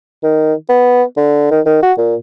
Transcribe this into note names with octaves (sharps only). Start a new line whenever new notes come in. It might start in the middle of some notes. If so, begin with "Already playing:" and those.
D#3
B3
D3
D#3
D#3
F#4
A#2